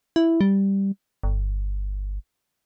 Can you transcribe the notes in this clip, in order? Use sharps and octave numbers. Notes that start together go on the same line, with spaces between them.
E4
G3
G1